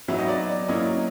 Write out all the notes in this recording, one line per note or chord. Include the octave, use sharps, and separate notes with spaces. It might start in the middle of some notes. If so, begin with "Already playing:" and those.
F#3 B3 D#4 E5
D#5
D5
F#3 A#3 C#4 E4 D#5